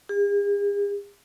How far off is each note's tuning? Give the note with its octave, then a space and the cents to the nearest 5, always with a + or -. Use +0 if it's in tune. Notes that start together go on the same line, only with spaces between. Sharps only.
G#4 -45